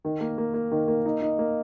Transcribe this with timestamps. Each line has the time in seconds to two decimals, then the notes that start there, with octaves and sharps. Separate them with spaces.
0.05 D#3
0.21 A#3
0.38 A#3
0.54 A#3
0.71 D#3
0.88 A#3
1.05 D#4
1.22 D#4
1.39 A#3